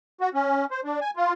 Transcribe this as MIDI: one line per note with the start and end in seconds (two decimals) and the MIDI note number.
0.21 0.29 66
0.34 0.65 61
0.71 0.81 72
0.84 1.00 62
1.01 1.10 80
1.16 1.33 65